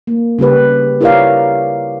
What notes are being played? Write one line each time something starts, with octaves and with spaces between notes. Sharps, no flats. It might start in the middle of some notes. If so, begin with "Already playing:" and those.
A#3
C#3 G3 G4 B4
E4 G4 A#4 C#5 D5 F5